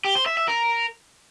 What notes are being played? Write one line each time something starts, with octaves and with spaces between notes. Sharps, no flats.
G4
C5
E5
E5
A#4